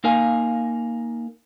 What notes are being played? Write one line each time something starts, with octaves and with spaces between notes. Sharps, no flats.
A#3 D#4 A#4 F5 G#5